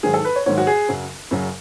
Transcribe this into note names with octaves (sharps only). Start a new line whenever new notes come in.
G#2 D#3 F#3 G#4
A4
B4
C#5
G#2 D#3 F#3 C#5
F#4
G#4
F#2 C#3 F#3
F#2 C#3 F#3